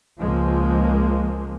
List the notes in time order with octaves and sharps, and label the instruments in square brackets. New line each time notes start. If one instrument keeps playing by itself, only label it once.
[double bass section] C#2 F3 G#3 A#3